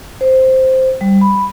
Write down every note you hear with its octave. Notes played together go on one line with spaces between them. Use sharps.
C5
G3
B5